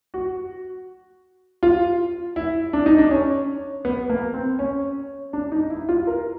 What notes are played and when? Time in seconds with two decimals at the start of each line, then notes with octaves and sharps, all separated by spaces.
0.14 F#4
1.63 F4
2.36 E4
2.73 D4
2.86 D#4
2.98 D4
3.11 C#4
3.85 B3
4.10 A#3
4.34 C4
4.59 C#4
5.33 D4
5.52 D#4
5.70 E4
5.89 F4
6.07 A#4